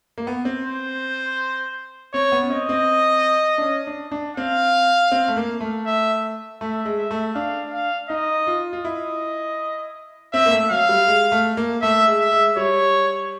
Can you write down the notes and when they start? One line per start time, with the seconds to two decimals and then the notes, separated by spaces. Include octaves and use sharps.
0.18 A#3
0.27 B3
0.45 C4
0.64 C5
2.13 C4 C#5
2.32 B3
2.43 C#4
2.50 C4 D#5
2.69 C4
3.58 D4
3.62 C#4
3.87 D4
4.11 D4
4.37 C4 F5
5.12 C4
5.28 A3
5.37 A#3
5.61 A3
5.86 E5
6.60 A3 E5
6.85 G#3
6.98 E5
7.11 A3
7.35 D4 F5
7.73 F5
8.09 D#4 D#5
8.47 F4
8.73 F4
8.84 E4 D#5
10.33 C4 E5
10.46 A#3
10.51 A3
10.70 F#3 F5
10.89 G3
11.07 G#3
11.32 A3
11.57 A#3
11.82 A3 E5
12.07 G#3
12.19 E5
12.32 G#3
12.56 G3 C#5